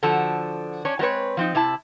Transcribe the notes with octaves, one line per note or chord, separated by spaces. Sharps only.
D3 F3 F#4 A4
C#4 D4 C#5
F#3 G#3 C4 B4 C#5
F3 C4 D#4
C3 E4 A5